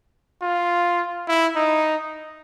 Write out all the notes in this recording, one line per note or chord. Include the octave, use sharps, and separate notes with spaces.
F4
E4
D#4